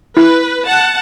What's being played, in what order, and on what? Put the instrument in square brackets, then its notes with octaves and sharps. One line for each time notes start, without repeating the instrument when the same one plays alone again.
[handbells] E4 [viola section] B4
[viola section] F#5 A5